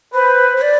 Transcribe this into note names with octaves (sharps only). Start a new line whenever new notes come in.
B4 C5
C5
D5